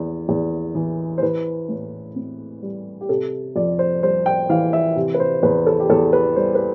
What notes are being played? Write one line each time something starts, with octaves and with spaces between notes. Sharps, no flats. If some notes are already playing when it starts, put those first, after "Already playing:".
Already playing: E2
E2
E3
C5
E3 B4
A2
C4
G3
G4
C3 A4
F2 D5
C5
G3 C5
G5
E3 F5
E5
C3
B4
C5
E2 B4
A4
G4
E2 A4
B4
G3 C5
B4